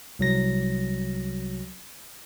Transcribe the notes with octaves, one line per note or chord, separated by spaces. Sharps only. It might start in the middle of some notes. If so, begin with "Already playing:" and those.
C2 F#3 A#6